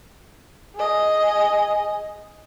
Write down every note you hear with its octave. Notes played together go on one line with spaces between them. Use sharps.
G#4 D#5